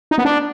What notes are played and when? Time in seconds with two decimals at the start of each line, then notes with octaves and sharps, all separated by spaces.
0.11 D#4
0.18 B3
0.25 D4